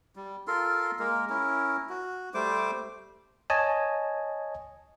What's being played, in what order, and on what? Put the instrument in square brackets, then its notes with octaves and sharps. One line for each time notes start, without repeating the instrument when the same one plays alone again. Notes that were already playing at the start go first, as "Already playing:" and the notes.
[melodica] G3
F4 A4 A#4 C6
G#3 A#3 A#4
C#4 E4 A#4
F#4
G3 A3 C5 D6
[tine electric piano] C#5 D#5 G#5 A5